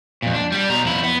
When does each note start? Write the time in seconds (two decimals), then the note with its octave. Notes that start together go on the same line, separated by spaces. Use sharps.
0.22 F2 A#2
0.34 D4
0.52 G3 G4
0.69 B2 A#5
0.85 F2 E4
1.03 B3